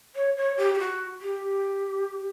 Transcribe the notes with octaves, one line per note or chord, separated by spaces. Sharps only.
C#5
C#5
G4
G4
F#4
G4